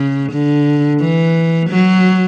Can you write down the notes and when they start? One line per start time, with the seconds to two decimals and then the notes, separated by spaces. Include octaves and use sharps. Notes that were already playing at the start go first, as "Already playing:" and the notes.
Already playing: C#3
0.32 D3
1.00 E3
1.69 F#3